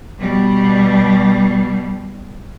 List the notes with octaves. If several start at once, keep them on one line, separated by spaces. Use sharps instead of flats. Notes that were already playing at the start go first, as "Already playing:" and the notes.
B2 G3